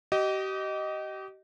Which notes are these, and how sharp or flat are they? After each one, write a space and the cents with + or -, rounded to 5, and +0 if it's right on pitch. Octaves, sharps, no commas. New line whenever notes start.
G4 -35 D#5 +0